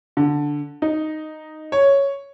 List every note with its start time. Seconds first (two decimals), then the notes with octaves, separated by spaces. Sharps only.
0.17 D3
0.82 D#4
1.72 C#5